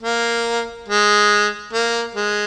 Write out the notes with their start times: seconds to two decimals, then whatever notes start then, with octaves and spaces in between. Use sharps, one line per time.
0.02 A#3
0.88 G#3
1.73 A#3
2.16 G#3